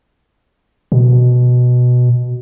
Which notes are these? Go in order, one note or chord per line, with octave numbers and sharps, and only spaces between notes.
B2